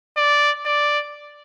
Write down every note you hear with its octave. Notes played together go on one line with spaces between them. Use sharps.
D5
D5